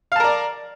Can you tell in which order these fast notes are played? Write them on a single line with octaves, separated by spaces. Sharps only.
F5 A5 A#4 D5